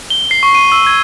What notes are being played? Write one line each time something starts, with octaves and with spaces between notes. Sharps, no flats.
G7
C7
C#6
D#7
E6
G#6